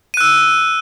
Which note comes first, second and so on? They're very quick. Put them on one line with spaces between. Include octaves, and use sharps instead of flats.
D#7 F#6 E6